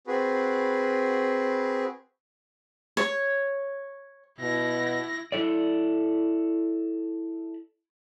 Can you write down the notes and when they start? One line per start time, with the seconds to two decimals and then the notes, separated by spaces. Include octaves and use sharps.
0.07 C4 F#4 G#4 B4
2.97 C#5
4.40 B2 E4 A#6
5.32 E4 A4 D5